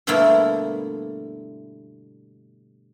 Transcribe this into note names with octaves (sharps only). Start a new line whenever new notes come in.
G2 B2 D3 A3 A#3 E4